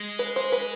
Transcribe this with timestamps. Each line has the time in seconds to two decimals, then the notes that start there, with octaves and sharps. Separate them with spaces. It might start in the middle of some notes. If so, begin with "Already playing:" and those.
Already playing: G#3
0.19 B4
0.36 C5
0.52 B4